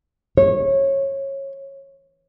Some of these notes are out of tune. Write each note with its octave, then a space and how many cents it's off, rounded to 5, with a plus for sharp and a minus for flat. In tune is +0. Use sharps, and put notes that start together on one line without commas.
C#5 -20